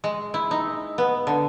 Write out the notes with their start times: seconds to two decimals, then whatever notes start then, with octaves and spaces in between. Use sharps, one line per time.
0.04 G#3
0.34 E4
0.51 D#4
0.98 B3
1.27 D3